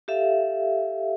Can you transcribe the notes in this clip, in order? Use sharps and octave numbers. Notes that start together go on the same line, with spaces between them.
G4 A4 E5 F5